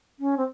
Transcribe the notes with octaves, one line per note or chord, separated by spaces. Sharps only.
C#4
C4